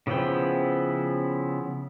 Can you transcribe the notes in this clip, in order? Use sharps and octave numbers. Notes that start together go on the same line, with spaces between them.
C#3 F3 B3 E4 G5